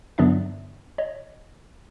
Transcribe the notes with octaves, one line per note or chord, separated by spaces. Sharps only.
G2 D3 F#3 B3 D4 D5 E5
C#5 D#5